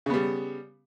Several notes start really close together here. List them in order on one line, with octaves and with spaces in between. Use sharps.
C#3 B3 G3